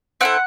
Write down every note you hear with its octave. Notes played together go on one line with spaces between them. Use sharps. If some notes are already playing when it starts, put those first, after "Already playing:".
C4 E4 A4 F#5